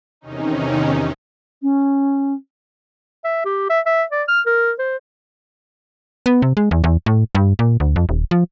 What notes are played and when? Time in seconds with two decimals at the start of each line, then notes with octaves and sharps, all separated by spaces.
0.21 E2 C3 D#3 C#4 D#4
1.62 C#4
3.24 E5
3.45 G4
3.70 E5
3.86 E5
4.11 D5
4.28 F6
4.46 A#4
4.79 C5
6.26 B3
6.42 C3
6.57 G#3
6.71 E2
6.84 E2
7.06 A2
7.35 G2
7.59 A#2
7.80 D2
7.96 F2
8.09 D#1
8.31 F3